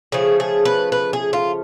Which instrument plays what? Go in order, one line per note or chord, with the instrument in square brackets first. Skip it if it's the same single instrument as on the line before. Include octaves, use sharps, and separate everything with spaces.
[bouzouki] C#3 F3 A3 G#4
G#4
B4
B4
G#4
F4